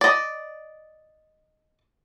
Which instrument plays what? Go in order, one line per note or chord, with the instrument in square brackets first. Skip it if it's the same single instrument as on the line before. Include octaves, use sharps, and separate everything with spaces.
[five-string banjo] D5 D#5